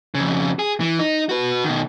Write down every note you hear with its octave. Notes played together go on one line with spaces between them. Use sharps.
F2 C#3
G#4
E3
D#4
F#4 B4
B2 D#3